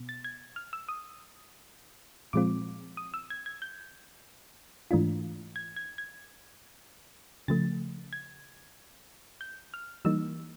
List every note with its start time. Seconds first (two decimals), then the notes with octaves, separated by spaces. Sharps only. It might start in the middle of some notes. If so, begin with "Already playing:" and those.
Already playing: B2 B3
0.09 A6
0.24 G#6
0.56 F6
0.73 E6
0.88 D#6
2.33 A#2 F3 G#3 C4 F4 D6
2.97 D#6
3.14 E6
3.30 G#6
3.46 G#6
3.62 G6
4.91 G#2 E3 A3 D4 F4
5.56 G#6
5.76 G#6
5.98 G#6
7.48 C#3 F3 A3 A6
8.13 G#6
9.41 G6
9.74 F6
10.05 E3 G3 A#3 D#4 E6